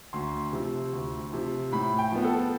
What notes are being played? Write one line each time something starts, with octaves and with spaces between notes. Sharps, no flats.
D2 C6
C3 F3
D2
C3 F3
A2 B5
G5
F3 B3
A4